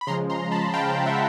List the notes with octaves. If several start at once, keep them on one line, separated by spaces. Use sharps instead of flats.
B5
C#3 F3 G#3 A#5 C6
A#5 C6
A5 B5
F5 G5
F5 G5
E5 F#5